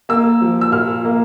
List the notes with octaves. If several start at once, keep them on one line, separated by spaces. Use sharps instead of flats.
A#3 E6
F3
E6
A#2 F6
A#3